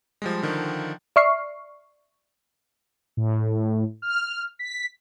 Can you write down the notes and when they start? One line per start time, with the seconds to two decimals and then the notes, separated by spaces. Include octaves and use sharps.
0.22 F3 G3 G#3
0.43 D3 D#3 F3
1.16 D5 E5 C#6 F6 C7
3.17 A2
4.02 F6
4.59 B6